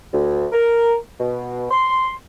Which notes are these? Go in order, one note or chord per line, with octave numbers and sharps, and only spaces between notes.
D2
A#4
B2
C6